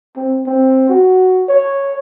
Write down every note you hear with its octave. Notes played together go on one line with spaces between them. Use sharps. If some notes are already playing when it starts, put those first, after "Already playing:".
C4
C4
F#4
C#5